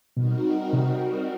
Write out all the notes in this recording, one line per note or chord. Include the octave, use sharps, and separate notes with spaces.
B2 G3 C4 D#4 F#4 A#4
C3